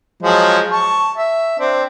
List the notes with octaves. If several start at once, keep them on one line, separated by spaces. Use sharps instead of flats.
F3 F#3 G#3
A5 C#6
E5
C4 D4